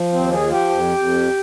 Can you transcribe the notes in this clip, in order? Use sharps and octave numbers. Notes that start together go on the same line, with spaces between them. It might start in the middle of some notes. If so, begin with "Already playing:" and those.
Already playing: F3
D#2 C4
G#4
F3
G4
F2
F2